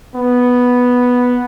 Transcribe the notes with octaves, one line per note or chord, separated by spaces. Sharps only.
B3